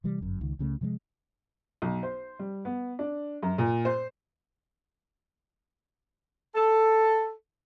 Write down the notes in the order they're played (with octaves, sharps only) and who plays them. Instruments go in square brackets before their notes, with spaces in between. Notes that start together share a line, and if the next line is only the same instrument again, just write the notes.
[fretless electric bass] C3 E3 G3
G1 F#2
C#2 D#3
C#2 C#3 G3 A3
C3 F3 G3 G#3
[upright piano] B1
C5
G3
B3
D4
F#2
A#2
C5
[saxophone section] A4